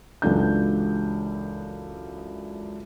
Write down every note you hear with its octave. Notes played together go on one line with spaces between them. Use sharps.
C#2 F#2 E3 D4 A4 G6